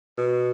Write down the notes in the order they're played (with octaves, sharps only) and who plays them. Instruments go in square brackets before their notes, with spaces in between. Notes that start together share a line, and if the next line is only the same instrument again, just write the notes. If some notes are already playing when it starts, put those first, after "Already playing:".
[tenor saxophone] B2